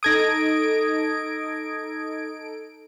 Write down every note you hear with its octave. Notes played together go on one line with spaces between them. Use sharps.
D#4 A4 D#6 G#6 A#6 D7